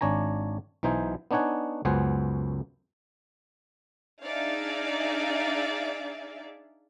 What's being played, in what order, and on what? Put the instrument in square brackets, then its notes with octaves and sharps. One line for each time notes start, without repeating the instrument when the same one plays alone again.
[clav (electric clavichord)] G#1 D4 C#5 G#5 A#5
B1 E3 D#4 C5 G#5
B3 D4 D#4 C#5 F#5 G#5
C#2 F#2 B3 C5 F#5 G#5
[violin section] D4 D#4 G#4 D5 E5 F5